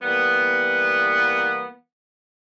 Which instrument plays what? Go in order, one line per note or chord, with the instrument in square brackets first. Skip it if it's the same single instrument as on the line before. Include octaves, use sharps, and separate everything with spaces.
[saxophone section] E3 G3 A#3 B3